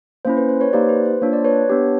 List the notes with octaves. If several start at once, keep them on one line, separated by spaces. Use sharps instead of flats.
A#3 C#4 E4 C5
B4
C5
B4 C#5
A#3 D#4 G4 C5 D5
B4
C5
A#3 D4 F4 C#5
D5
B4 C#5
B3 D4 G4